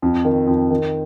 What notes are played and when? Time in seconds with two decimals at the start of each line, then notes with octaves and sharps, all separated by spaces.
0.02 F2
0.25 D#3
0.47 F2
0.70 D#3